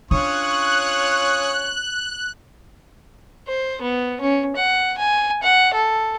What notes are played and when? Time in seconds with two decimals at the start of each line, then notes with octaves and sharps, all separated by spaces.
0.11 C#4 D4 F4 C#5 C#6 D#6 F#6
3.48 C5
3.82 B3
4.21 C#4
4.56 F#5
4.98 G#5
5.43 F#5
5.75 A4